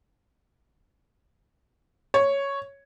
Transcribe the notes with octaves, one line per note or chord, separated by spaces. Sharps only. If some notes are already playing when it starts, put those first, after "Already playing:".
C#5